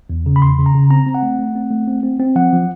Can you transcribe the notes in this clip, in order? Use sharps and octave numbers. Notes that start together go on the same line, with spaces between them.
E2
C#3
B5
E2 C6
C#3
A#5
C#3
C4 A#5
C4
F#5
A3
A3
C4
A3
C4
C4
C4
F3 F#5
F3